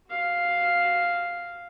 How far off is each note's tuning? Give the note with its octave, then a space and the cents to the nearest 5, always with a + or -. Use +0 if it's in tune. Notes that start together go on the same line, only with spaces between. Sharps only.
F#4 +0 F5 +0